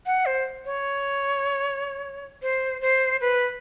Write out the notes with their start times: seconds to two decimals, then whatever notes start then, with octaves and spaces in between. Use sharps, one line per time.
0.06 F#5
0.26 C5
0.65 C#5
2.42 C5
2.81 C5
3.21 B4